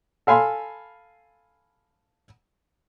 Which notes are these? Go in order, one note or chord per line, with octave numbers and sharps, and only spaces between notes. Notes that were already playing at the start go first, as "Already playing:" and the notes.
A4 F5 G#5 B5 C6